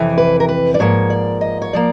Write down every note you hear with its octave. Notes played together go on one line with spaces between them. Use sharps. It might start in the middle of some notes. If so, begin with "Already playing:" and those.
Already playing: F2 C3 E3
B4
A#4
B4
D5
G#2 F3 A#3 C#5
D5
D#5
C#5
F3 A#3 D5